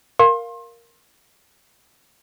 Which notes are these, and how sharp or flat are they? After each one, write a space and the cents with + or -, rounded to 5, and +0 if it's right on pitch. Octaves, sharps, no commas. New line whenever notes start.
A#4 +0 F5 +0 C6 +30